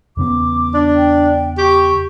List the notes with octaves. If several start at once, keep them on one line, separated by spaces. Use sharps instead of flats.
E2 C#3 B3 D6
D4
G5
G4 C#6